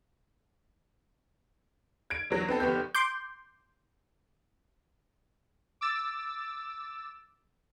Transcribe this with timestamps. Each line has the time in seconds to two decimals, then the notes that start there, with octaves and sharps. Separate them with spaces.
2.10 G#6 D7
2.30 E2 F#3
2.48 B3 C4 A4
2.60 F1 B3 G4 G6
2.95 C6 D6 G6
5.81 D6 E6 A6